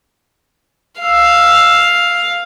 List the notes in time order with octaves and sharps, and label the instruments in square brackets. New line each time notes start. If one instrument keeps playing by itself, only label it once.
[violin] F5 [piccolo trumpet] E6